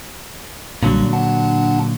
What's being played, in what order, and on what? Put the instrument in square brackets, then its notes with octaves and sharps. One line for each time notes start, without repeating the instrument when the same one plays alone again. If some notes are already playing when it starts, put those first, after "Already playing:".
[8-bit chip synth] B1 G3 [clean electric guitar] A#2 D3 F#3
[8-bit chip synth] D4 F#5 A5